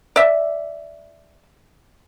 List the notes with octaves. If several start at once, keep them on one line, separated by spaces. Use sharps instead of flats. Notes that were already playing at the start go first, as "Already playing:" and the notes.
D5 E5